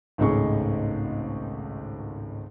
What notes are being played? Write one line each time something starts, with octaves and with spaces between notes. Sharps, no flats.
G#1 C#2 A2 D#4 G#4 C#6